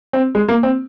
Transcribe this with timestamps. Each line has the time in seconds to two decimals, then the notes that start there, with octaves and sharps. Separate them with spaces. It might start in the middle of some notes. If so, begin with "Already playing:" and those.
0.13 C4
0.35 G#3
0.48 A#3
0.63 C4